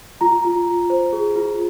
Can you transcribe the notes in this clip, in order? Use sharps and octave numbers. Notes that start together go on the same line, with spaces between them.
F4 A#5
F4
F4
C5
G#4
F4